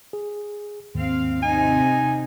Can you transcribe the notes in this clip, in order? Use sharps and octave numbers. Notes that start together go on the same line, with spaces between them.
G#4
D#2 G#2 D#3 C4 F5
C3 D#4 G#5